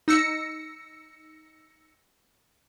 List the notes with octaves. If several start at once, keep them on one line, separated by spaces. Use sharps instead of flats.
D#4 E6 A#6 C#7